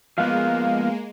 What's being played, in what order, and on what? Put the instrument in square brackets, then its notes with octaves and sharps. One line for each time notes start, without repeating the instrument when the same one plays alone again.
[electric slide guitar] F3 B3 [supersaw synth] G#3 A#3 [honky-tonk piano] F5